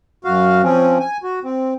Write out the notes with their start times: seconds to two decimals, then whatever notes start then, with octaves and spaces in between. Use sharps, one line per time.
0.25 F#2 F#4 F5
0.63 F3 C4 C#4
1.00 G#5
1.23 F#4
1.44 C4